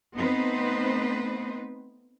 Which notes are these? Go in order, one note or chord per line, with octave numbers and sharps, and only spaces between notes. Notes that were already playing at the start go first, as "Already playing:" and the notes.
A3 B3 C4 D#4 B4 C5